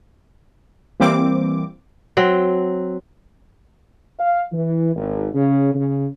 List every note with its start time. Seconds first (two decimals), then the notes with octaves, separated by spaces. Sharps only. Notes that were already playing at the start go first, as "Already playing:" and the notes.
1.00 E3 G3 A#3 C4 D6
2.17 F#3 C4
4.19 F5
4.53 E3
4.95 G#1
5.34 C#3
5.74 C#3